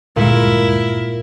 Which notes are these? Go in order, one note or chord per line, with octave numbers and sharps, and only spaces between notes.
D2 G2 A#2 G#3 E4 A#4 C#7